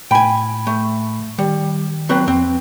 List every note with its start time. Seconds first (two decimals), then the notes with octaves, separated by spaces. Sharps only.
0.11 A2 G5 G#5 B5
0.67 A3
1.39 D#3 G3
2.09 F#3 C4 B4
2.28 F2 C4